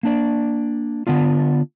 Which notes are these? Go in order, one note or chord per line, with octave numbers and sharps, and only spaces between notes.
A#3 D4 D5
D3 B3 D4 F4